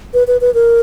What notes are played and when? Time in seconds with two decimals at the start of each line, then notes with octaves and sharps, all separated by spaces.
0.14 B4
0.27 B4
0.41 B4
0.54 A#4